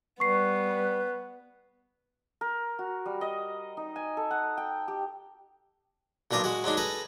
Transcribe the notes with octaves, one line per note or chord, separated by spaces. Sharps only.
G3 B3 B4 C#6 C7
A#4
F#4
G3
D#5
D#4
G#5
A4
F#5
G5
G4
B1 A#2 D4 A#5 D#6
G#3 F#4 G#4
F#3 G#3 D4 D#4
G#4 A4 B4 A#5